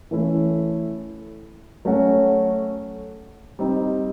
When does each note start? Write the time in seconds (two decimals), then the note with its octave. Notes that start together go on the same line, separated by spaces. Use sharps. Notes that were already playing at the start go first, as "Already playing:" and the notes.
0.11 E3 A3 C#4 E4
1.85 F#3 A3 C#4 F#4
3.59 G3 C4 D#4